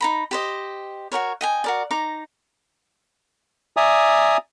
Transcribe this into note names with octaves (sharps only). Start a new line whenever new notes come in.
D#4 A#5 B5
G4 C5 D#5
F#4 G4 A#4 C#5
D#5 G5 G#5
F#4 A#4 D5
D#4 A#5 D6
D5 E5 G#5 A#5 D#6